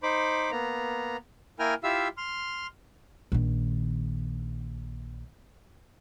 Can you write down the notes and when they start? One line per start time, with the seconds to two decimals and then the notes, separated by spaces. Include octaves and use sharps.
0.03 D#4 C5 B5 D6
0.51 A#3 B3 A#5
1.59 A#3 E4 A#4 G5 G#5 F6
1.83 E4 F4 G4 E5 F5 E6
2.17 C6 F6
3.32 A#1 D#3